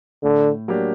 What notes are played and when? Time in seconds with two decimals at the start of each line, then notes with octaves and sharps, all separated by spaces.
0.23 A2 D3
0.68 F#3 A#3 D4 G4